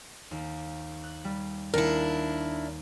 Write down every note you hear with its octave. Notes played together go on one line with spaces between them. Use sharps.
D#2
F#6
G3
D#2 D4 E4 G4 A#4 C#7